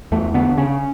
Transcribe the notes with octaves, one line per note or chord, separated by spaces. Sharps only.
E2 A3
D3 B3
C#3 C#4